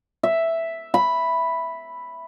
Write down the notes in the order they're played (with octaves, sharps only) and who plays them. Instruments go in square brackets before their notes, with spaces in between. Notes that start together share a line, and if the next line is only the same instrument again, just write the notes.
[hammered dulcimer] E5
B5